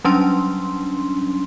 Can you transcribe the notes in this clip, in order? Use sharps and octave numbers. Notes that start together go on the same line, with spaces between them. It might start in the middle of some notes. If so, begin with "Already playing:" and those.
F#3 G3 C#4 D4 C6